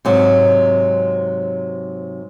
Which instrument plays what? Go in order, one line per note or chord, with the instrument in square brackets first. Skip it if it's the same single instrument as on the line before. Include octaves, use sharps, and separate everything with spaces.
[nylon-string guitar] G#2 C3 F#3